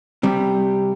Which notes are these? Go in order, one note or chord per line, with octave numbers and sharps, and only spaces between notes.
C3 G3